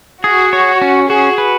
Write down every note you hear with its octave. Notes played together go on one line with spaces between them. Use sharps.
F#4 G#4
C#5
C#4
F#4 G#4
B4